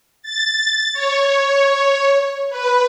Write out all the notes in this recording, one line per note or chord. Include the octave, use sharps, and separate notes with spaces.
A6
C#5
B4